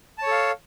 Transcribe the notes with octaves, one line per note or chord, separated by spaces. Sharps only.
A4 C#5 F5 A5